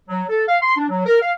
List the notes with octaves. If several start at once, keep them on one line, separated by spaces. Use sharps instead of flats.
F#3
A4
F5
C6
D4
F#3
A#4
F5